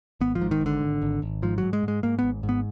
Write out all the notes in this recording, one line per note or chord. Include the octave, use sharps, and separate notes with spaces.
G#1 B3
F3
G#2
D#3
G#1 D3
G#1
G#1
G#1
G#2 F3
G#2 F#3
G#3
G#2 G#3
G#2 A#3
G#1 B3
G#2
B3